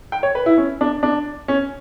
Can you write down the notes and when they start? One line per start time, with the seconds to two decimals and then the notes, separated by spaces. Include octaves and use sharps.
0.12 G5
0.23 C#5
0.35 B4
0.46 E4
0.58 C#4
0.81 D4
1.03 D4
1.48 C#4